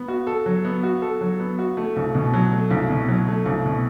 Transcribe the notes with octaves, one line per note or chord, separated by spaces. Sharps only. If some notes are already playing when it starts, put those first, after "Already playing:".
Already playing: B3
F#4
A4
F#3
B3
F#4
A4
F#3
B3
F#4
A3
C2
B2
F#3
A3
C2
B2
F#3
A3
C2
B2